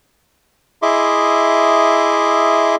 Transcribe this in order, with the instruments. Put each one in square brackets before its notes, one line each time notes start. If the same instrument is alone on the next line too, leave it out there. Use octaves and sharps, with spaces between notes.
[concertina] E4 G#4 D#5 E5 C6 D6